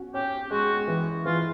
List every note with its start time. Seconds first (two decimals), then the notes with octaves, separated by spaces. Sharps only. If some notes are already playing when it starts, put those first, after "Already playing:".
Already playing: C#4 F#4
0.14 C#4 G4
0.51 G#3 F#4
0.88 E3
1.26 E3 F4